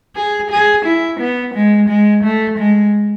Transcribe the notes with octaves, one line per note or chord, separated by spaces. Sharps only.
G#4
G#4
E4
B3
G#3
G#3
A3
G#3